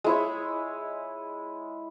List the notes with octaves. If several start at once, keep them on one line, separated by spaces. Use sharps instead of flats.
G#3 E4 C#5